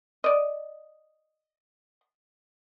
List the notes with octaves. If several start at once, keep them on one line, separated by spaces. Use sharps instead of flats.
D5 D#5